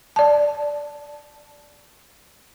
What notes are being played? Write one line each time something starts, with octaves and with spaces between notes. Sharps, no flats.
D5 A5